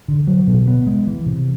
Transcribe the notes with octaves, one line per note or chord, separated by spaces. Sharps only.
D3
F#3
B2
B3
G#3
E3
C3